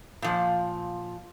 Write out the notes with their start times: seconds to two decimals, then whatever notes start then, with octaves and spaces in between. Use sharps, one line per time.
0.22 A#2 F3